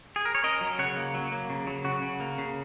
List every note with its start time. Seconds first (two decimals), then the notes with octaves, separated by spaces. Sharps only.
0.16 G#4
0.25 A#4
0.35 C#5
0.43 C#4 A#4 D#5
0.61 F#3
0.79 C#3 C#5 F#5
0.97 A#3
1.14 F#3
1.32 A#3
1.50 C#3
1.67 F#3
1.84 C#3 F#4
2.02 C#3
2.20 A#3
2.38 C#3